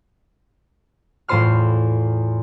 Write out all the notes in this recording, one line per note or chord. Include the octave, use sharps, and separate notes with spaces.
E2 A2 F4 C5 C6 F6